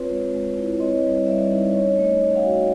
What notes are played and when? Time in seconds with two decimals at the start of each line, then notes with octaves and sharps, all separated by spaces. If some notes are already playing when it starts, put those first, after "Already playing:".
Already playing: C4 F4 B4 C#5
0.10 G#3
0.34 G#3
0.57 E4
0.79 C4 C#5 D#5
1.03 G3
1.26 G3 D5 E5
1.50 D#4
1.73 C#4 C#5 D#5
1.96 A3
2.03 C#5 D#5
2.19 A3
2.35 F5 G5
2.43 F#4